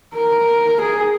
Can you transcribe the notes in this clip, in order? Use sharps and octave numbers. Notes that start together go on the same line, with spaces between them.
A#4
G#4